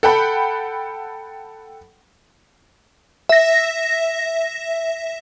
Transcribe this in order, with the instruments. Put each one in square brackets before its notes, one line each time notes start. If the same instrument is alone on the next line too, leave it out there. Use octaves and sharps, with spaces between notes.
[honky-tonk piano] A4 F#5 G5 B5
[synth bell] E5 A#6